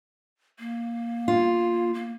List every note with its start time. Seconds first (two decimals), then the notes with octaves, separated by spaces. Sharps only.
0.59 A#3
1.28 F4
1.94 A#3